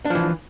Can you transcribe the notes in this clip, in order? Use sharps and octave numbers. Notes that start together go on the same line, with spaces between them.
E3 F3 D4